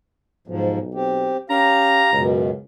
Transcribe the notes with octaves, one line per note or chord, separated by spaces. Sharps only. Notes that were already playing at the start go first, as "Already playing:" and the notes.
B1 G#2 F3
C4 G4
C#4 G4 F5 A#5
C#2 F#2 B2